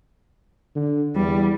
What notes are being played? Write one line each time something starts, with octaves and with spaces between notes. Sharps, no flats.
D3
E2 G3